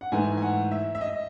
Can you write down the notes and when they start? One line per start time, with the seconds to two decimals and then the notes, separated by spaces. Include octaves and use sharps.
0.01 F#5
0.12 G#2 E3 A3 G#5
0.37 G#5
0.42 F#5
0.71 E5
0.95 E5
1.01 D#5